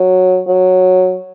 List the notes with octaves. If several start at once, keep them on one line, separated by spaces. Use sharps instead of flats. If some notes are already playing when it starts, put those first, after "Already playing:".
Already playing: F#3
F#3